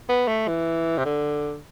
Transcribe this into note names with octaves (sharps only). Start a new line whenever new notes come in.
B3
A3
E3
C3
D3